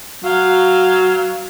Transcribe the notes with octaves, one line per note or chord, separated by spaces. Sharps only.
F#3 F5